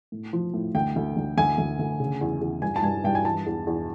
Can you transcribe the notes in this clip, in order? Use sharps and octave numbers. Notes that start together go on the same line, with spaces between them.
A2
F3
A2
D2 G5
D2
D2
D2 G#5
D2
D2
C#3
E2
E2
G2 G#5
A5
G2 G#5
G2 G5
G#5
E3 A5
E2
E2